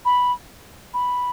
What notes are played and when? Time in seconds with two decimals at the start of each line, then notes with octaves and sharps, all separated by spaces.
0.05 B5
0.94 B5